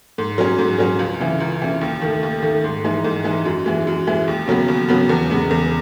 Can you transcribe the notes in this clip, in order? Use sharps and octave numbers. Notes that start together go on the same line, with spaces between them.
G#2
F#3 C#4 G#4
G#2
F#3 C#4 G#4
C#2
C#3 E3
C#2
C#3 E3
D#2
D#3 A3
D#2
D#3 A3
G#2
E3 G#3 D#4
G#2
E3 G#3 D#4
F#2
E3 G#3
F#2
E3 G#3
D#2
C#3 F#3 B3
D#2
C#3 F#3 B3
E2
C#3 G#3 B3
E2